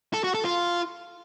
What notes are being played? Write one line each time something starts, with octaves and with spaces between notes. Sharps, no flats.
A4
F#4
A4
F4